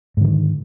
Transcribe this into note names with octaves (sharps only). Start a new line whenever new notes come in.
G#2 D3 D#3 F3